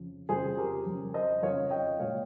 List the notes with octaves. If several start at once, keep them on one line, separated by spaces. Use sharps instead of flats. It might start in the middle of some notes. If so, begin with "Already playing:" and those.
Already playing: F2 C#3 F3
F2 C#3 F3 G#4 C5
G4 A#4
F2 C#3 F3
C5 D#5
F2 C#3 F3 C#5 F5
D#5 G5
A#2 G#3 C#5 F5